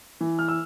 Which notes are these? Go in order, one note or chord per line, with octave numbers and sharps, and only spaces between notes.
E3
F6
E6